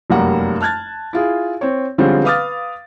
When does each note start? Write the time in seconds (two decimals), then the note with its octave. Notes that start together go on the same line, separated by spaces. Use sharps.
0.10 F1 F#2 G3 A#3 F#5
0.60 A5 F6 F#6 G#6 A6
1.13 E4 F4 G#4
1.61 C4 C#5
1.98 D3 F3 G3 G#3 C4 C#4
2.24 B4 F5 D6 D#6 F6 A6